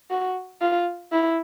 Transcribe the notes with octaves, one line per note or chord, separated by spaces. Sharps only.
F#4
F4
E4